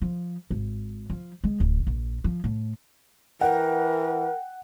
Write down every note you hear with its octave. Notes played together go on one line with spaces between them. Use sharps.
F3
G#1
F3
G#3
D1
A#1
F3
A2
E3 A#4 F#5 G5